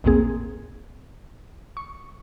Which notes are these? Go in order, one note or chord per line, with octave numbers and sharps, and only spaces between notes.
A1 D#2 A#2 A#3 C4 G#4
C#6